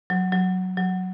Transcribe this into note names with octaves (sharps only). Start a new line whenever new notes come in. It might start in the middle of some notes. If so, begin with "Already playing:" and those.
F#3
F#3
F#3